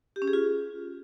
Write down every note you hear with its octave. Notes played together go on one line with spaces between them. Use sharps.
G4
C#4
G#4
F4